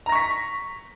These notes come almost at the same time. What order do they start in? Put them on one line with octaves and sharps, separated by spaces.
A#5 A#6 C#6 B6